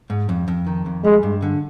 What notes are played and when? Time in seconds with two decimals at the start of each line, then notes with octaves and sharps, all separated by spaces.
0.10 G#2
0.29 F2
0.48 F2
0.67 D#3
0.86 F2
1.04 G3 G#3
1.23 G2
1.42 D3